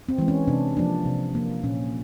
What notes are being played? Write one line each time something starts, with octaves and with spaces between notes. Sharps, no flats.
C4
E3 G#3
C#4
C3 D4
F3 A#3 D4
C3
F3 A#3
A#2 C#4